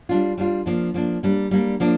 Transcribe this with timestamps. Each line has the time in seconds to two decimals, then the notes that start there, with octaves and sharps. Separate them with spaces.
0.09 G3 D4 F4
0.37 G3 D4 F4
0.66 F3 A#3 D4
0.94 F3 A#3 D4
1.23 G3 A#3 D4
1.51 G3 A#3 D4
1.80 F3 A#3 D4